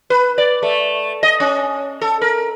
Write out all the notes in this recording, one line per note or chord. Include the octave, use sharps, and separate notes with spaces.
B4
D5
A3
D#5
C#4
A4
A#4